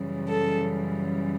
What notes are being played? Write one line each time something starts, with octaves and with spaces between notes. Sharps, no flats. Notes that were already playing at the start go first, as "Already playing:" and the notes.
Already playing: F#2 C#3 E3 G3
A4